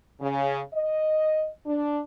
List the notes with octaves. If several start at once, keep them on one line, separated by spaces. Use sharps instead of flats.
C#3
D#5
D4